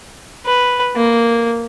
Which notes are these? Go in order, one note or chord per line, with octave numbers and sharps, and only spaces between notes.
B4
A#3